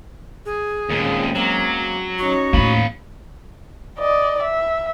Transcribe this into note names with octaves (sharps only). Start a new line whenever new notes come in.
G#4
D#2 A#2 G#3 C4 C#4
F#3 A#3
C#4 D#4 F#4 C#5
D#2 A2 A#3 B5
D5 D#5
E5